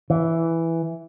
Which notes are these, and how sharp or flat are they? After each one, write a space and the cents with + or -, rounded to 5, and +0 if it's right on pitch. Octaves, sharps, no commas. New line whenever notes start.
E3 +0